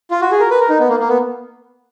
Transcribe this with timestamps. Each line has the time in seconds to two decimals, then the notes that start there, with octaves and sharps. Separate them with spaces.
0.11 F4
0.22 F#4
0.31 G#4
0.40 A#4
0.51 B4
0.60 A#4
0.69 D#4
0.80 B3
0.89 A#3
1.00 A#3
1.09 B3